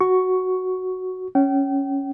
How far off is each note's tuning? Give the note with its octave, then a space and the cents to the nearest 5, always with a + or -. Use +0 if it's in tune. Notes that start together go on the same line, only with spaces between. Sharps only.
F#4 +0 C#6 +5
C#4 +0 G5 -35